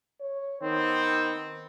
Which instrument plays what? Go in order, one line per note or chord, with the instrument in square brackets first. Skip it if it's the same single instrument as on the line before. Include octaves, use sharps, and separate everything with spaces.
[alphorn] C#5
[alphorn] D#3 [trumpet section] B3 C4